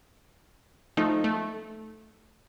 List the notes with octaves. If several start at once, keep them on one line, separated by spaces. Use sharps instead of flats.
F3 A3 D#4
A3